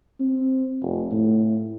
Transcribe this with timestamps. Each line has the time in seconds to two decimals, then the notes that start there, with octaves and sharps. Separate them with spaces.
0.20 C4
0.82 F1
1.11 A2